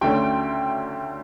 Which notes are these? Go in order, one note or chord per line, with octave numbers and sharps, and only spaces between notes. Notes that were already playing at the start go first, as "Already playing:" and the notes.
D2 D3 A3 C#4 G5